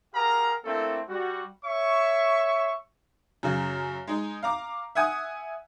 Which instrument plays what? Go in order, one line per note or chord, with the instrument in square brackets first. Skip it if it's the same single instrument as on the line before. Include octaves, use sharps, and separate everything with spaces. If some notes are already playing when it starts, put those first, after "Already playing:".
[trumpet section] G4 G#4 A#4 F5 F#5 A#5
A3 A#3 C4 D4 E4 A4
G3 F#4
C#5 E5 C#6
[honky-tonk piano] F#2 C#3
G#3 D#4
F5 A#5 D6
E5 F#5 G#5 D#6